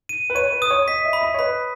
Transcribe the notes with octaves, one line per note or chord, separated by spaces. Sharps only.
D#7
B4
C#5 D#7
B4
D#6
C#5
D#5 B6
E5
B5
D#5
C#5
B4 B5